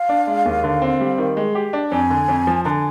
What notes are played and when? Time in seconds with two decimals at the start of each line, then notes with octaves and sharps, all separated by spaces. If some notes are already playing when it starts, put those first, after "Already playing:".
Already playing: F5
0.09 D4
0.27 G#3
0.45 D#2
0.63 D3
0.82 C4
1.00 G3
1.18 D#3
1.37 G#3
1.55 G4
1.73 D4
1.91 F2 G#5
2.10 D3
2.28 F2
2.47 F3
2.65 D3 G#5 A#5